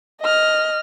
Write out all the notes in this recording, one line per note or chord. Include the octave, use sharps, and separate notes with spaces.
D#5 F6